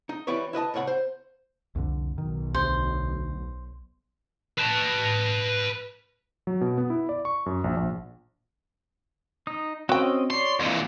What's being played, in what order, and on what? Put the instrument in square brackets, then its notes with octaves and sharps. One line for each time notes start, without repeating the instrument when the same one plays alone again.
[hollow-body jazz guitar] D#4
E3 G3 E4 B4 C#5
E4 B4 D#5 A5
C2 A2 C#5 F#5 B5
C5
[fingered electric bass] C2 F2 D3
[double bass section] B1 [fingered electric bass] D#3
[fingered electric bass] D2 [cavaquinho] C5
[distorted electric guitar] B4 A5
[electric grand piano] F#3
B2
B3
E4
D5
C#6
F#2
A#1
A#1
[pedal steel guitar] D#4 D#6
[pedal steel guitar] C4 C#4 D#5 [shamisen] F#4 G5
[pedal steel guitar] C#5 D5 [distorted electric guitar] C6
[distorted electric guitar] F2 A#2 [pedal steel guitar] E3